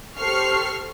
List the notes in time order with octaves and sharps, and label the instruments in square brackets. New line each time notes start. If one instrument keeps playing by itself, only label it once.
[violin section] G4 A4 C5 C#6 F6 C7